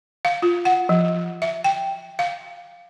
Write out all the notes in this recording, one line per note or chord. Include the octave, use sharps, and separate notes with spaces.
F5
F4
F#5
F3
E5
G5
F5